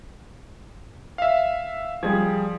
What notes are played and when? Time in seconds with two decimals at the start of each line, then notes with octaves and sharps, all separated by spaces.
1.18 E5 F5
2.03 F3 G3 G#4 G#6